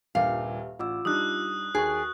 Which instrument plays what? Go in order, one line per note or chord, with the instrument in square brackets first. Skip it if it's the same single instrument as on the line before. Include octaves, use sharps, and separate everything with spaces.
[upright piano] D#1 G2 A#2 [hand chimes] G4 B4 E5 [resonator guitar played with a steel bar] F5
[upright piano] A1 [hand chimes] F4 D6 E6
[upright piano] G3 D4 D#4 [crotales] D#6 F#6
[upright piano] D#2 [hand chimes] F#4 C#6 [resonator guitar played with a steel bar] G#4